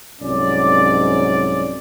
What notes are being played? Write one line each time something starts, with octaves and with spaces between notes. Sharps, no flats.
C2 G#2 F#3 C#4 D5